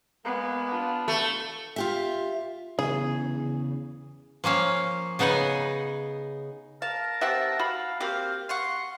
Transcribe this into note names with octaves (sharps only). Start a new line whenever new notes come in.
G#3 A#3 B3
D4 F4
A3
F4 G4 E5
E2 C#3 G#4
F3 A#3 C#4 F5
C#3 B3 D#4 F#5 G#5
A#4 F5 A5
C4 G4 E5 F#5 A5
F#4 F5 B5
A#3 C4 F#4 G4 F5
F5 F#5 C6 C#6